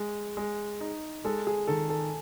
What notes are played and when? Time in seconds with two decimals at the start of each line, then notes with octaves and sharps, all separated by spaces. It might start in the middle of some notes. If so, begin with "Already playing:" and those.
Already playing: G#3
0.37 G#3
0.81 D#4
1.25 G#3 A4
1.47 G#4
1.67 D#3 A4
1.90 A4